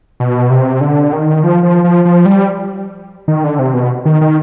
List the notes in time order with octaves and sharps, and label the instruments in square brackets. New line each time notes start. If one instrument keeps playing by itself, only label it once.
[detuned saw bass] B2
C3
D3
D#3
F3
F3
F3
F3
G3
D#3
D3
C3
B2
D#3
D#3